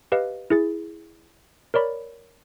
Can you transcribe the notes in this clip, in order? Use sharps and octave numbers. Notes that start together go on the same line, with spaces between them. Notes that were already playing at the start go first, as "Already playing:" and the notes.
G4 B4 D#5 F5
E4 G#4 A6
A#4 C#5 D5 B5